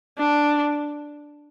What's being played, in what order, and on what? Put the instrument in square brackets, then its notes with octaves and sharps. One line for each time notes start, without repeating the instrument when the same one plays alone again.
[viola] D4